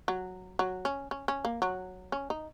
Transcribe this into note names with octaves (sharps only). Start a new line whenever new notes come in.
F#3
F#3
C#4
C#4
C#4
A#3
F#3
C#4
D#4